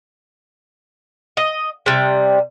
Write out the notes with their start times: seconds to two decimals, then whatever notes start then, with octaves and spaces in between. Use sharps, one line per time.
1.37 D#5
1.86 C3 G3